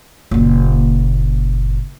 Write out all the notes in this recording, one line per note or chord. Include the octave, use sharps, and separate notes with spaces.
F#1 A#2